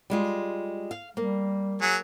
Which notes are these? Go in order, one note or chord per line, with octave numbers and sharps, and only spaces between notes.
G3 G#3 F4
F5
G3 A#3
F#3 G#4